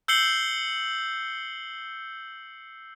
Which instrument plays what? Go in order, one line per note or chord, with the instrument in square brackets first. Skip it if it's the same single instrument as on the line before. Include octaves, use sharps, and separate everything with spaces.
[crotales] E6 G6 C7 C#7 F#7 G7